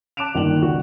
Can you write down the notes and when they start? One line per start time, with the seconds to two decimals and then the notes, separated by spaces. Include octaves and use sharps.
0.17 A5 D6 F#6 D7 E7 F7
0.35 G1 D#3 A#3 D5 F#7
0.62 C#2 F#4